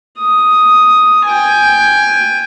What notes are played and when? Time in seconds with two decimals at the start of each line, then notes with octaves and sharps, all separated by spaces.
0.19 D#6
1.25 G5 G#5